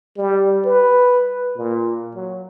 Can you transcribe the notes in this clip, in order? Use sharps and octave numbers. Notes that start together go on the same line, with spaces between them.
G3
B4
A#2
F#3